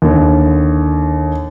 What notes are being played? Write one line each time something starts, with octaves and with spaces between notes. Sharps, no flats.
D#2 D3